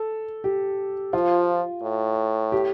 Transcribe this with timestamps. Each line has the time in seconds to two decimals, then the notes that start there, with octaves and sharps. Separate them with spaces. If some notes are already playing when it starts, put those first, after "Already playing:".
Already playing: A4
0.44 G4
1.13 F3 F4
1.83 A2
2.52 G4